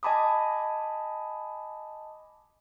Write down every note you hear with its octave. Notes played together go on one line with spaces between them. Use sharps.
D#5 G#5 A5 B5 D6 D#6